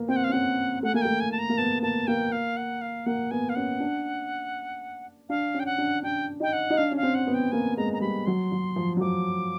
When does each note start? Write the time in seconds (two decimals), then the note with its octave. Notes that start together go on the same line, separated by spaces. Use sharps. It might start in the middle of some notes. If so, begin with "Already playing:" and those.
Already playing: A#3 B3
0.08 C4 G5
0.16 F#5
0.24 F5
0.29 C#4
0.32 C4 F#5
0.83 A3 F#5
0.94 A#3 G#5
1.02 A3 G5
1.20 G#5
1.32 A5
1.39 A#5
1.49 A#3
1.58 B3 A5
1.82 A#3 A5
2.07 A#3 G5
2.32 F5
2.57 F#5
2.81 F5
3.06 A#3 F#5
3.31 B3 G#5
3.49 F5
3.55 C#4 F#5
3.80 D4
5.29 D4 F5
5.54 C#4
5.60 G5
5.66 F#5
5.78 D4
6.03 D4 G5
6.40 D#4 G5
6.53 F#5
6.70 D#4
6.77 D4 F5
6.91 C#4
6.97 F5
7.03 C4
7.15 F#5
7.27 B3
7.34 G5
7.52 A#3 G#5
7.77 G#3 A#5
7.93 A#5
8.01 G3 B5
8.26 F#3 C6
8.52 F#3
8.76 F3
8.97 F#3
9.00 F3 D6